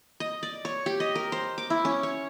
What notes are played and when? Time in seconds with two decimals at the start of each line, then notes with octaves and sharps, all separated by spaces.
0.20 D#5
0.43 D5
0.65 C#5
0.86 G4
1.00 D#5
1.16 A#4
1.32 C5
1.58 D6
1.70 E4
1.85 C#4
2.03 C#5